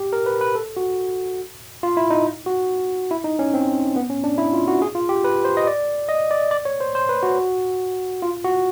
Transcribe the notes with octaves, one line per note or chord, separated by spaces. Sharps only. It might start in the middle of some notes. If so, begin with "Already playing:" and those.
Already playing: G4
A#4
B4
B4
A4
F#4
F4
E4
D#4
F#4
E4
D#4
C#4
C4
B3
C#4
D4
E4
F4
F#4
G#4
F4
G4
B4
C5
D#5
D5
D#5
D5
D5
C#5
C5
C5
B4
F#4
F4
F#4